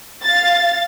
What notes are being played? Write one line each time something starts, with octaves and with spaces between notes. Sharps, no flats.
F5 A6